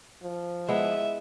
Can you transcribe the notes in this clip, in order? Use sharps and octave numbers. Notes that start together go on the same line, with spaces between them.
F3
G#3 B3 E4 E5